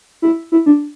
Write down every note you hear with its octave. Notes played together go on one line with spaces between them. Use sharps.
E4
E4
D4